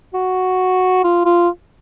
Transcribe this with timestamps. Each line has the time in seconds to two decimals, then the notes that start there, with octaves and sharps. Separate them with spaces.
0.14 F#4
1.04 F4
1.25 F4